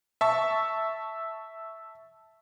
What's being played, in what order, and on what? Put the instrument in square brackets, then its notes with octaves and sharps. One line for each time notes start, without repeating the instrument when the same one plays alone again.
[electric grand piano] E5 A5 C#6